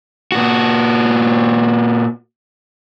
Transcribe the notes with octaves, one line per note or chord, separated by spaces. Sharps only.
A#2 F#4